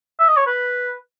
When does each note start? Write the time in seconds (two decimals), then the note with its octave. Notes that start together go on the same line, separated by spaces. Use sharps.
0.19 E5
0.28 D#5
0.37 C#5
0.47 B4